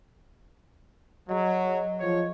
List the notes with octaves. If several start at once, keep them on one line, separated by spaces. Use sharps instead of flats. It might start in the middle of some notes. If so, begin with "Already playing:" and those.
F#3 G#4 D#5
F3 C#5